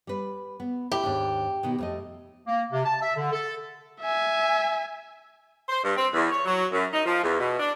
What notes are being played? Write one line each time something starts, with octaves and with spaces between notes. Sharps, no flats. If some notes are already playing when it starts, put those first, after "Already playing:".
G3 B4
B3
E4 G4
D#2 G#2 D4
B2 D#3 B3
F2 A3 D#5
A#3
C3
A5
E5
D3
A4
E5 G#5
C5
G2
C4
E2
C#5
F#3
F#2
D#4
F3
E2
B2
D4